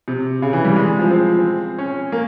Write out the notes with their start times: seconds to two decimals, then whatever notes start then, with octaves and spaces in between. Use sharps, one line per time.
0.08 C3
0.42 C#3
0.53 E3
0.64 G3
0.76 G#3
0.99 F3
1.10 C4
1.78 C#4
2.12 A#3